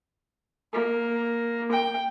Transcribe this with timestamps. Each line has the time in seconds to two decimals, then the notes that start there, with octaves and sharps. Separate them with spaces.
0.73 A#3
1.72 G5